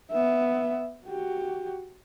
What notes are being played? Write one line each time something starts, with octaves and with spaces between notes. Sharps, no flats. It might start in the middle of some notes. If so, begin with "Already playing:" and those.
B3 E5
F#4 G4